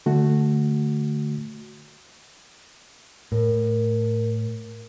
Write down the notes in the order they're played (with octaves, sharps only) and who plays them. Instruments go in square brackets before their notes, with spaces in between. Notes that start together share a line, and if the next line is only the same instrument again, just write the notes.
[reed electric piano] D3 A3 F#4
[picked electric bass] A2 [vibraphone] A#4